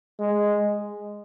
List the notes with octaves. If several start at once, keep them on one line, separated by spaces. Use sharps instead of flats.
G#3